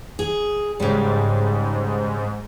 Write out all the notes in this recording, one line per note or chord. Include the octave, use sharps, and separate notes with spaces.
G#4
G#2 C#3 G3